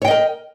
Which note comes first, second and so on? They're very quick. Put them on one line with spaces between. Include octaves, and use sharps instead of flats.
C#5 G5 D#5 A#4